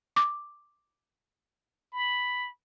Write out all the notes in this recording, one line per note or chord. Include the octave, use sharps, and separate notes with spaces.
D6
B5